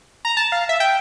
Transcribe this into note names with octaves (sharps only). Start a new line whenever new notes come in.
A#5
A5
F5
E5
G5